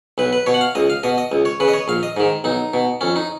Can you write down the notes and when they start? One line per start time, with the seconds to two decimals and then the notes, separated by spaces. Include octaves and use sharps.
0.18 B1 B4
0.33 B4
0.46 B2 C#5
0.54 F#5
0.61 F5
0.75 C#2 D#5
0.90 F5
1.03 B2 D#5
1.18 D#5
1.32 C#2
1.45 C#5
1.60 C#3 B4
1.68 D#5
1.73 C#5
1.88 A#1 F5
2.03 D#5
2.17 G#2 D#3
2.44 B1 D#4
2.73 B2
3.01 F2 C#4
3.16 D#4